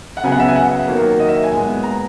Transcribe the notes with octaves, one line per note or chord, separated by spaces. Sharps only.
F#5
C#3 F#3 B3 G#5
F#5
E5
G#5
F#5
D#3 F#3 A#3
D#5
E5
G#5
A#2 G#3 B3
A#5